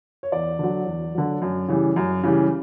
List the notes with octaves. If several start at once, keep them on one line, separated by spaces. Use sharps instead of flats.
C#5
E2 D5
D3 F#3
E2
D3 F#3
F#2
C#3 E3 G3
F#2
C#3 E3 G3